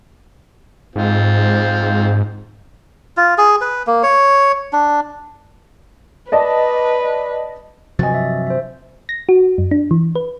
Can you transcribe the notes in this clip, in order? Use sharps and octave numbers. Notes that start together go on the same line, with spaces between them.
G#2 C4 F4
F4
G#4
B4
A#3
C#5
D4
B4 D5 D#5 A5
G2 C3 F3 F#3 D#5 G#5 A6
E5
C5 E5
A#6
F#4
F#2
D4
E3
B4